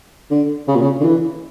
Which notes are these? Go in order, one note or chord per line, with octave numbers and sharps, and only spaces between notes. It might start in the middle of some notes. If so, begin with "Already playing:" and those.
D3
C#3
A#2
C#3
D3
E3